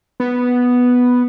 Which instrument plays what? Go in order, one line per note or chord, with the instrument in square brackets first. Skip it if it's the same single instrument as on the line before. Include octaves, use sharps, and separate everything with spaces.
[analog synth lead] B3